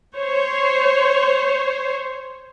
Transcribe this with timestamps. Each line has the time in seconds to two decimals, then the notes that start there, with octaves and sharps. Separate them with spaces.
0.15 C5 C#5